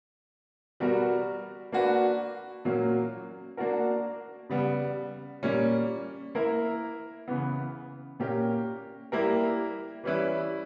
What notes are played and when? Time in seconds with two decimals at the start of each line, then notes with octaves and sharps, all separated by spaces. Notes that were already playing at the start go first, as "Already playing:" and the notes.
0.80 B2 G3 B3 F#4 A#4
1.72 A#3 D4 F#4 B4
2.65 A#2 F#3 A#3 C#4
3.57 A#3 D4 F#4 A#4
4.49 C#3 G3 B3
5.43 A#2 G3 A#3 C#4
6.35 A#3 E4 A#4
7.28 C#3 E3 B3
8.20 A#2 A#3 C#4 G4 A#4
9.12 G3 A#3 E4 G4 A#4
10.04 E3 G3 C#4 E4 B4